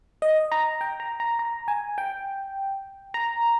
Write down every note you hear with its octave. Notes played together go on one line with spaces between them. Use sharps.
D#5
A#5
G5
A#5
A#5
A#5
G#5
G5
A#5